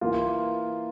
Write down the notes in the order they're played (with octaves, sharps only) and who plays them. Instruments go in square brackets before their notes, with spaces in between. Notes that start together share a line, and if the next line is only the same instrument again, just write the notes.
[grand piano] E3 A#3 F4